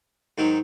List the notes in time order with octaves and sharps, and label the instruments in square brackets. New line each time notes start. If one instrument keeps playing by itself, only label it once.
[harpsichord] G#2 D#3 F#3